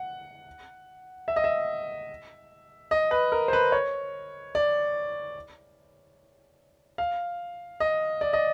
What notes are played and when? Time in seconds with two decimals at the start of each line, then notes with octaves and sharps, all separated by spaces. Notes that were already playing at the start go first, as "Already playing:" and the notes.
Already playing: F#5
1.28 E5
1.36 D#5
1.44 E5
2.91 D#5
3.11 B4
3.32 A#4
3.48 C5
3.53 B4
3.72 C#5
4.55 D5
6.98 F5
7.80 D#5
8.21 D5
8.33 D#5